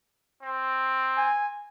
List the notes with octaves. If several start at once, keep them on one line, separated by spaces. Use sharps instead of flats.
C4
G#5